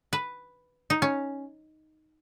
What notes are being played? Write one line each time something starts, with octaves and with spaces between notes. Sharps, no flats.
B4
D#4
C#4